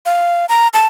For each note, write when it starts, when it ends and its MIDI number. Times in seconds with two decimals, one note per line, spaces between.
0.06 0.46 77
0.49 0.68 82
0.74 0.87 81